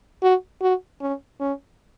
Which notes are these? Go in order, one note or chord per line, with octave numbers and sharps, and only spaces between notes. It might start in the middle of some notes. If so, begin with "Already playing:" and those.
F#4
F#4
C#4
C#4